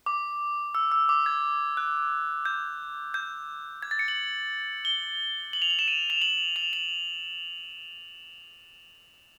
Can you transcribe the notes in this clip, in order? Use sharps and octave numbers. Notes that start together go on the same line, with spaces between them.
D6
E6
E6
D6
G#6
F#6
G6
G6
G#6
A6
C#7
F#7
G7
F#7
F7
F#7
E7
D#7
F7
F#7
F7
F#7